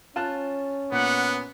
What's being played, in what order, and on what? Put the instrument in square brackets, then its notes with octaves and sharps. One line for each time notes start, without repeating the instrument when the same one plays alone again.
[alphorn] C#4 [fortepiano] F4 A5 F#6
[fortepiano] A#2 [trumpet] B3 [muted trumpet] F#5